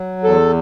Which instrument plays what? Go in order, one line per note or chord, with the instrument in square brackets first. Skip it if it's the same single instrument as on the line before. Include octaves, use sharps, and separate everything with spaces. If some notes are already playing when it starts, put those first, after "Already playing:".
Already playing: [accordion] F#3
E2 A4